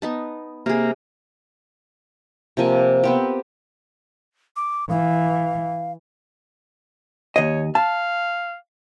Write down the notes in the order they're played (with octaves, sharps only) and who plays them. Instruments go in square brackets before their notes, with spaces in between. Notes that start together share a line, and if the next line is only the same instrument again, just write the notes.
[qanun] B3 D#4 A5
[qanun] C3 G#4 [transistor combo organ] A#3
[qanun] C3 F3 A#3 G#5
B3 C4 G4
[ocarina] D6
[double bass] E3 [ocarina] F5
[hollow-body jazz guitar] D#2 D#5 [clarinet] C#5
[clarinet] F5 [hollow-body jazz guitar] A5